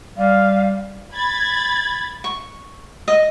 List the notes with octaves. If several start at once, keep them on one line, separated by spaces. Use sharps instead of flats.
G3 F5
B5 G#6 A6
C#6
D#5